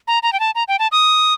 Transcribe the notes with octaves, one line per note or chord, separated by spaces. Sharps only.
A#5
A#5
G5
A5
A#5
G5
A5
D#6